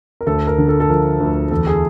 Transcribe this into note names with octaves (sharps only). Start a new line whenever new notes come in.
A#4
D2 A4
A#4
D3
A4
A4
F3 A#4
D2
E2 A4
G#4